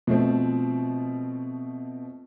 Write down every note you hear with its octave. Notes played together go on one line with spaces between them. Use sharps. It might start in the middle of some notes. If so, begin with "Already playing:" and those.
B2 F3 A3 C4